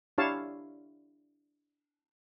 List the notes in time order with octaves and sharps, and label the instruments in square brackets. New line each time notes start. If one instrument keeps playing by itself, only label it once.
[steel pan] D4 E4 G4 C#5 F5 A5